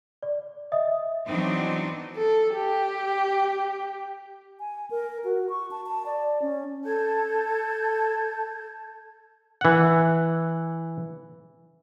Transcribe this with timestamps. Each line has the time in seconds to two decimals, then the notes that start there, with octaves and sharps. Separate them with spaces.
0.23 D5
0.72 D#5 E5 D#6
1.26 E3 F#3 B3 C4 D4 D#4
2.16 A4
2.54 G4
4.60 G#5
4.91 A#4
5.24 F#4
5.49 C#6
5.71 A5
5.86 A5
6.06 D5
6.42 C#4
6.85 A4 A5 G6 G#6
9.61 E3 F#5